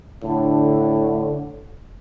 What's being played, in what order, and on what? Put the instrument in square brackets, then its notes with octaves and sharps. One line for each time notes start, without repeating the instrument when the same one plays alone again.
[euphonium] A2 [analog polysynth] D3